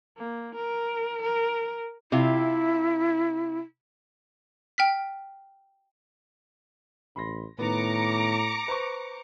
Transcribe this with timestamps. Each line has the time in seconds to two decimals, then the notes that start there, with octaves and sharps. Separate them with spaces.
0.18 A#3
0.55 A#4
1.22 A#4
2.12 C3 E4 F4
4.78 G5 F6 B6
7.16 A1 B5 C6 A#6
7.59 A2 D#3 B3 A#5 D6 C#7
8.68 B4 C5 C#6